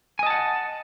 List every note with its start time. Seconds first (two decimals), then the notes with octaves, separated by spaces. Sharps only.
0.19 G#5
0.23 D#5
0.27 A5
0.30 F#5